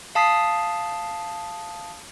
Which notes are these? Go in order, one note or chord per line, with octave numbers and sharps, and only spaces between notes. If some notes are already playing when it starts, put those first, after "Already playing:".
F5 A5 D#6 B6 C7